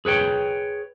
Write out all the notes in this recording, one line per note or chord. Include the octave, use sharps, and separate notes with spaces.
G#4 B4 C#5 G5